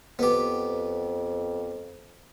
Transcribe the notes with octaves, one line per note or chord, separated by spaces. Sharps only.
F2 B3 G4